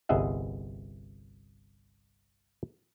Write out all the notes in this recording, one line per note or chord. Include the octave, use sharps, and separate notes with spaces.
G1 C2 G#4 D#5 E5 F#5